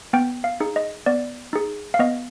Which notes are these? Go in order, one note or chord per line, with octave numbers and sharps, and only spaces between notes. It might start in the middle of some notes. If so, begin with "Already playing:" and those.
B3 G5
F5
D#4 G#4
D#5
B3 D5
D#4 G#4
F5
B3 D#5